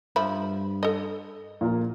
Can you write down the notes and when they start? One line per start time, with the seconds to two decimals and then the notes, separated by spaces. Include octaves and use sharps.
0.16 G2 F3 E5 B5
0.83 A4 D#5
1.61 A#1 A#2 A#4